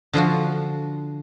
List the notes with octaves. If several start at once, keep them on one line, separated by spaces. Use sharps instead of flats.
D3 F3 F4 F#4